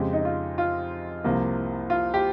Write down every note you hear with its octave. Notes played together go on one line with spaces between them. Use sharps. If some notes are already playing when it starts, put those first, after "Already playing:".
Already playing: F2 C#3 G#3 G4
D#4
F4
F4
C2 C3 F3 A#3
F4
G4